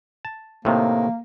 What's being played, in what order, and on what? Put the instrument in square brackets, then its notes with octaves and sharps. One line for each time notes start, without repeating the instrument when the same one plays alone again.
[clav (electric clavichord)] A5
[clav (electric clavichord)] A2 C3 D#3 [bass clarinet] A#3